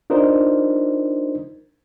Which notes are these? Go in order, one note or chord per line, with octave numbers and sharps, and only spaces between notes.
D4 D#4 F4 A#4 C5